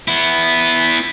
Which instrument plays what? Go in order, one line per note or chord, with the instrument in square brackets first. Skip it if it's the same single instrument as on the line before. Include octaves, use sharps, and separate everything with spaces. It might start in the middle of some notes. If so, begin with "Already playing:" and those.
[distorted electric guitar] B3 E4